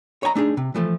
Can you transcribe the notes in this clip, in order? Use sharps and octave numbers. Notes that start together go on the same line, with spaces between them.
C#5 D#5 G#5 A#5
A3 D4 D#4 G#4
C3
E3 F3 A3